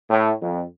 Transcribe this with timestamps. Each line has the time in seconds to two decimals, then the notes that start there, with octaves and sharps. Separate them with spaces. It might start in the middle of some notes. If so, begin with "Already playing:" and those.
0.09 A2
0.40 F2